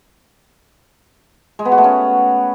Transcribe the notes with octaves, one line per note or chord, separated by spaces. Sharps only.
G#3
B3
F#4
A3
C#4